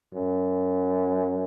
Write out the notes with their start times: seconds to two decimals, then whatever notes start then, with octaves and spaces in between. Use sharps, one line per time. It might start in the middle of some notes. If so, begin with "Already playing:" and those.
0.13 F#2